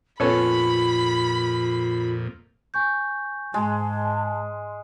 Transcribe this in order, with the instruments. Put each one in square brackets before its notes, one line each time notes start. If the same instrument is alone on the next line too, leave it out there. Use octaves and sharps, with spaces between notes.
[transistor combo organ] F2 A#2 [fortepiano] B3 C#4 A4 [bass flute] F4 [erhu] B5
[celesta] G#5 C#6 G6
[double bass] G#2 [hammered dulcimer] G#3 [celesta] G#5 C6 [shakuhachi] A5